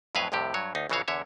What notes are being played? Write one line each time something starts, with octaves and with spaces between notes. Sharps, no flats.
F2 A2 F#3 B4 F5 G#5
C2 F2 A2 C3 G4
G2 F#3 C#5
D2 D#4
A#1 C#3 E3 F#4 C#5 F5
E2 D3 C#5 E5